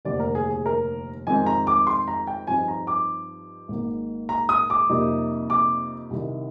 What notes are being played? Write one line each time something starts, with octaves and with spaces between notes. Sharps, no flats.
F1 D#2 D3 G3 D5
A#4
G#4
G#4
A#4
F2 D#3 G#3 C4 G#5
A#5
D6
C6
A#5
G5
G2 F3 C4 D#4 G#5
A#5
D6
G#1 G#2 D#3 A#3
A#5
D#6
D6
F2 C3 G3 A#3 D#4
D6
C2 C3 D#3